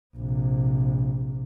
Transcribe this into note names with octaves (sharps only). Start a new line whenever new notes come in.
A#1 C3